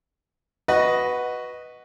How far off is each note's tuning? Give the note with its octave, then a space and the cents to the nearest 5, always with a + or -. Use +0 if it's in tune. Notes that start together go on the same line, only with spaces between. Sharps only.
F#4 +0 B4 +0 D#5 +0